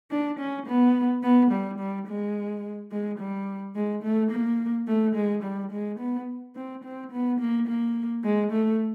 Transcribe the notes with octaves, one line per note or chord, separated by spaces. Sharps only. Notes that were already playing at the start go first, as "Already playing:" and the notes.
D4
C#4
B3
B3
G3
G3
G#3
G#3
G3
G#3
A3
A#3
A3
G#3
G3
G#3
B3
C4
C4
B3
A#3
A#3
G#3
A3